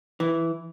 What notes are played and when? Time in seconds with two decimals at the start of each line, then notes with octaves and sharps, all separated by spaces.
0.20 E3